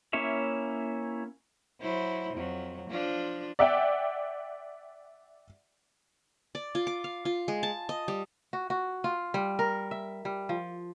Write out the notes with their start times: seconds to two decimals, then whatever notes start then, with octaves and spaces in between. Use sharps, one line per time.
0.13 A#3 C#4 E4 C#5 E5
1.80 F#3 E4 C5
2.34 F2 F#3
2.90 F3 D4 F4
3.59 D5 E5 F#5 G5
6.55 D5
6.75 F4
6.87 D6
7.04 F5
7.25 F4
7.48 G#3
7.63 A5
7.89 D#5
8.08 G3
8.53 F#4
8.70 F#4
9.04 F4
9.34 G3
9.59 A#4
9.91 E5
10.25 G3
10.49 F3